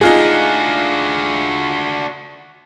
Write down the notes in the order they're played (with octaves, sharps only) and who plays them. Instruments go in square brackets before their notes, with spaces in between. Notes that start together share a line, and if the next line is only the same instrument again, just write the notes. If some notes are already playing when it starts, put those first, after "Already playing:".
[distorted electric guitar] D4 F#4 [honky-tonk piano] D#4 F4 G#4